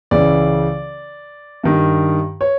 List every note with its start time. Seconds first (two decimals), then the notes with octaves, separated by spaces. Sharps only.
0.11 C#2 C#3 E3 D5
1.64 G2 D#3
2.41 C#5